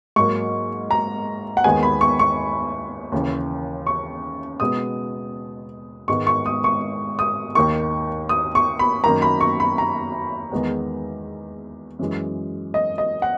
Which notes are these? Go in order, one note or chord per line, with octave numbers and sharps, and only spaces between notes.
G#2 F#3 A#3 C#6
A#5
F#5
D#2 D#3 G#3 B3 G#5
B5
C#6
C#6
D#2 C#3 E3
C#6
B2 G#3 B3 D#6
G#2 D#3 G#3 B3 C#6
C#6
D#6
C#6
D#6
D#2 D#3 A#3 C#6
D#6
C#6
B5
F#2 D#3 A#3 A#5
B5
C#6
B5
A#5
E2 D#3 G#3 B3
F#2 E3 G#3
D#5
D#5
F#5